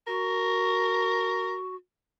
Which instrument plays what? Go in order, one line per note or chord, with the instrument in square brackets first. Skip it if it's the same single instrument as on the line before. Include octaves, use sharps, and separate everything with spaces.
[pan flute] F#4 [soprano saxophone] A#4